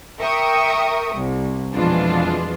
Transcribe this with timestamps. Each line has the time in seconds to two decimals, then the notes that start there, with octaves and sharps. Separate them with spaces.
0.19 A#4 E5 G5 C#6 D#6
1.15 C2
1.74 F2 B2 E3 G#3 D4 F4